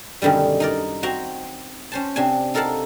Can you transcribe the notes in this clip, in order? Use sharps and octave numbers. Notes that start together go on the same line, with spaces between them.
F#2 B2 D3 D#3 G3
D#4 A#4 D5
C4 F#4 G5 A#5
C#4 C5 A5
C3 C4 D4 G#5
D#4 A4 A#4 F5 F#5 A5